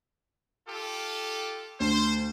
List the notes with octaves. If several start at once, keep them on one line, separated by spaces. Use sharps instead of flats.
F4 G4 A4
D2 C5